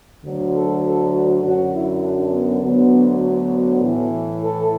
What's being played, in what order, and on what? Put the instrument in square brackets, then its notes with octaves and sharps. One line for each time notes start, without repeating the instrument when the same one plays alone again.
[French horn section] D2 D3 F#3
A4
A4
F#4
F#2 D3 F#3 F#4
E4
D4
B3
D2 D3 F#3 B3
B3
A2 E3
A4